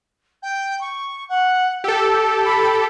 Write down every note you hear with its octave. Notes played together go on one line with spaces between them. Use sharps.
G5
C#6
F#5
G4 A4 E6
B5